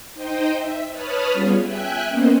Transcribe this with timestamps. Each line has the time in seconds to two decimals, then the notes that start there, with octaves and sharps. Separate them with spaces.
0.14 D#4 C5 D#5 G5
0.57 E5
0.91 B4 C#5 A5 B5 D#6 F6
1.33 G3 B3 C#4 F4 G#4
1.62 E5 G5 G#5 F#6
2.07 A#3 B3 C#4 C5 D#5